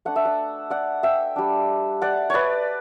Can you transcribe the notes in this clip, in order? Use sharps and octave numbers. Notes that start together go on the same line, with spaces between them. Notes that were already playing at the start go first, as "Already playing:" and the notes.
A3 D4 F#5
E5
D5 F#5
D5 F#5
E5 G5
G3 D4
D5 F#5
B4 C#5 D5